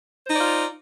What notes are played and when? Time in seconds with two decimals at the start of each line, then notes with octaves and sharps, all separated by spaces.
0.25 C5
0.30 D#4
0.34 D5
0.39 F4